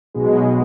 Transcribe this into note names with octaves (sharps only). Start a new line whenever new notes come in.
B1 B2 G#3